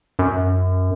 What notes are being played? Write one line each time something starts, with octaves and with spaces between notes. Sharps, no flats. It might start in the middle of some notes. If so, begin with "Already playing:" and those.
F#2